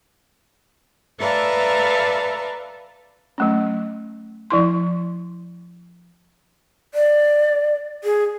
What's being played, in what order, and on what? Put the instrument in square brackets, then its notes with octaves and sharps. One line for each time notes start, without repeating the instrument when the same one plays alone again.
[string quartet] A4 B4 D5 E5 F5 A#5
[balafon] F#3 A3 C#4
F3 E4 C6
[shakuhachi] D5
G#4